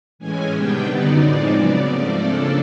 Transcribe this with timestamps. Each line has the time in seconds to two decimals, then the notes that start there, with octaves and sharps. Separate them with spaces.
0.19 A2 E3 G#3 C#4 G#5
0.52 C3 D#3 G3 B3 D4 G5
0.86 F#2 D3 F#3 B3 D#4 D5
1.19 A2 F3 G#3 C4 D#4
1.52 C#3 F#3 B3
1.86 G#2 F3 A3 C4
2.19 C#3 F3 A#3 D4 A4